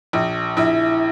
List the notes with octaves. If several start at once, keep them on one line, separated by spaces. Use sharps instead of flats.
A#1
A#1 E4